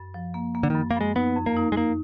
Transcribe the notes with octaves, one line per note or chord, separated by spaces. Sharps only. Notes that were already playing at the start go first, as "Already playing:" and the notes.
Already playing: F#2
F3
A#3
A#3
D3
F#2 D#3
A#3
F#2 G#3
B3 D#4
F2
A#3
D#4
G#3
A#3 D#4